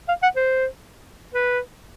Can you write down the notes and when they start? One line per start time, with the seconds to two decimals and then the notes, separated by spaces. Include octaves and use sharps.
0.08 F5
0.23 F#5
0.36 C5
1.34 B4